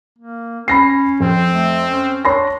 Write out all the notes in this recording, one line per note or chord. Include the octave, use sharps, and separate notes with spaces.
A#3
C#4 B5 A#6 C7
F2 C4
A3
C#4
D4 C#5 C6 A#6